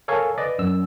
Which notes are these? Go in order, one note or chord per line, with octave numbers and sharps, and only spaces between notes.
A4 A#4 C#5 F5 G#5 C#6
B4 D5 D#5
F#2 E6